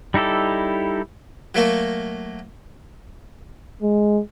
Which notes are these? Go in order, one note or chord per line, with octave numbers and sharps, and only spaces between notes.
G3 D#4 E4 G4 A4
F#3 A3 A#3
G#3